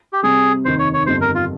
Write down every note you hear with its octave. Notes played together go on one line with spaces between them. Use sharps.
G4
C3 G3 C4 G#4
F1 D#2 D#3 C5
C#5
C#5
G1 F2 D#3 G3 C5
A#4
F4